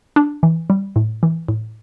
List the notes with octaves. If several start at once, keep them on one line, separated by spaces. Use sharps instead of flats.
D4
E3
G3
A2
E3
A2